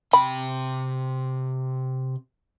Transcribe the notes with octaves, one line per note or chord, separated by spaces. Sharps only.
C3 G5 B5